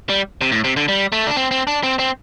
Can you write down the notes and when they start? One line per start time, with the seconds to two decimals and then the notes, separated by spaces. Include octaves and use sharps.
0.10 G3
0.41 C3
0.52 A2
0.64 C3
0.77 D3
0.88 G3
1.12 A3
1.27 D4
1.36 C4
1.51 C4
1.67 D4
1.83 C4
1.99 C4